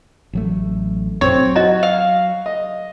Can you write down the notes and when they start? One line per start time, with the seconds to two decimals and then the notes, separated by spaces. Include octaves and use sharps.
0.33 A1 F#3 A3
1.21 A#1 F#2 C4 C#5
1.35 F#3
1.56 F#4 D#5 A#5
1.83 F5
2.46 D#5